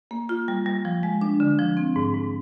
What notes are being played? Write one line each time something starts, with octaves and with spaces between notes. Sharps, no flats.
A#3
F4
G3
G3
F3
G#3
D4
D3
F3
C4
G#2
G#2